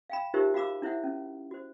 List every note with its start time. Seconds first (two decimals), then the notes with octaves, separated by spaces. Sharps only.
0.10 F5 G5 B5
0.34 D#4 F4 G4 A#4 C5 E5
0.54 F#4 F5 B5 D6 E6
0.82 D4 E4 C5 E5 F#5
1.04 C#4
1.51 F#4 C5